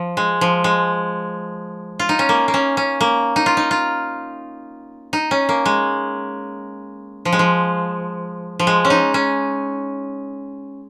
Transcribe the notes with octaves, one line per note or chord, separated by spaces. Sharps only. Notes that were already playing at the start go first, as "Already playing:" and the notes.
Already playing: F3
G#3
F3
G#3
F4
D#4
C#4
A#3
A#3
C#4
C#4
A#3
D#4
F4
D#4
F4
D#4
C#4
A#3
G#3
F3
G#3
F3
F3
G#3
C#4
D#4
C#4